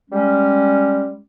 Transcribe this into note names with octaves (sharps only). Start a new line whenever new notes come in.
G3 G#3 C#4